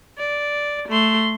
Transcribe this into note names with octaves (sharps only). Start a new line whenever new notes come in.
D5
A3 C6